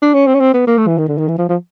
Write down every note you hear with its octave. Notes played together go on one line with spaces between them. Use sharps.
D4
C#4
C4
C#4
C4
B3
A#3
A3
E3
D#3
D3
D#3
E3
F3
F3